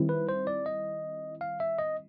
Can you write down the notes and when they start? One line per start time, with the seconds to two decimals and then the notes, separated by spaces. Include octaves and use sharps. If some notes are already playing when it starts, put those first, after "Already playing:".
Already playing: D#3 G3 C4 E4
0.09 B4
0.29 C5
0.47 D5
0.66 D#5
1.41 F5
1.60 E5
1.79 D#5